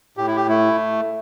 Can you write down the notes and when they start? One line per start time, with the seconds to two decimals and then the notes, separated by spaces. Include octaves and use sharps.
0.17 A2 G4
0.27 E4
0.36 G4
0.48 A3 E4